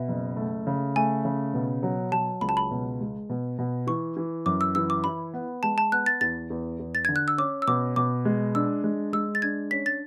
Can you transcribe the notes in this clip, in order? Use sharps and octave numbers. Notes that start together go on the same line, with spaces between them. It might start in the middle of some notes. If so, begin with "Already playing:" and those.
Already playing: B2 E5
F#1
A3
C#3
A3 G#5
C#3
B2
F#3
F#3 A5
C#2 B5
A5
B5
B2
G#3
B2
B2
E3 C#6
E3
F#2 D6
E6
E3 E6
D6
E4 B5
B3
G#3 A5
A5
B3 F#6
A6
E2 A6
E2
E2
A6
D3 G#6
F#6
E6
C#4 D6
E6
B2 D6
B2 D6
G#3
D4 E6
G#3
G#3 E6
A6
D4 G#6
C#4 B6
A6